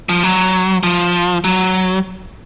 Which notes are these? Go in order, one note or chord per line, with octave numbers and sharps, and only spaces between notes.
F3
F#3
F3
F#3